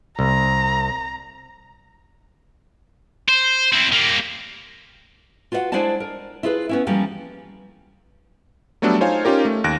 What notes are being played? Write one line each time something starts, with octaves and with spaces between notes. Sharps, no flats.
C2 A#5
C5
C4 E4
G3 A#3
F4 F#4 B4 D5 F#5
G#3 D4 E4 C5 D5 A5
A#4
E4 F4 G#4 A#4 B4
B3 C#4 E4
E3 F3 G3 A#3 C#4
F#3 G3 A3 B3 D4 A4
D#4 F4 C5 C#5 F5 G#5
C#4 D#4 F4 G4 A#4
A3
D#2 F#6 A#6 D7